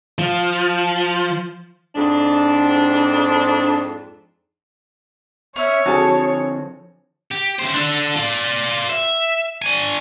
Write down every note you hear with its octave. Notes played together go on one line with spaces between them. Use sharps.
F3
F2 G#2 D4
C#4 C#5 E5
D3 F3 C4 F#4 G#4 A4 A5
G4
C#3 C5
D4 A4
F4 D5
E5
D4 G#5